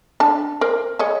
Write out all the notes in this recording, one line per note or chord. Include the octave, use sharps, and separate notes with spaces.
D4 A5
A#4 C5
G#4 C#5 D#5